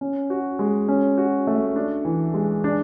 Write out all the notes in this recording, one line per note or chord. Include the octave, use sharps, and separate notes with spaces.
C#4
F#4
G#3
C#4
F#4
A3
D4
E3
G#3
D4